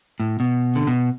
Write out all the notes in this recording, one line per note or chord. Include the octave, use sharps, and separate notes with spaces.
A2
B2
D3
B2